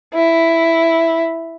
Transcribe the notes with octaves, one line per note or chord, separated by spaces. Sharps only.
E4